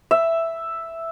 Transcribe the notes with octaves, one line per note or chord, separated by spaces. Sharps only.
E5